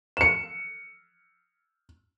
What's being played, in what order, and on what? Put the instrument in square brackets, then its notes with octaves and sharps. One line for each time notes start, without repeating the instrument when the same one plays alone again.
[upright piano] C#7 E7